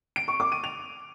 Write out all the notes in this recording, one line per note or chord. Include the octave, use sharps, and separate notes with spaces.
D7
C#6
D6
D#7
F7